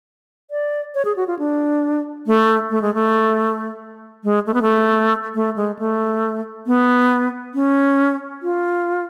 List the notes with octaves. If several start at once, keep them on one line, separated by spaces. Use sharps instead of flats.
D5
C#5
G#4
F#4
F4
D4
A3
A3
G#3
A3
G#3
A3
B3
A3
A3
G#3
A3
B3
C#4
F4